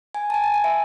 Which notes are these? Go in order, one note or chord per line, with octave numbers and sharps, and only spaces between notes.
G#5
A5
G#5
A5
G#5
E5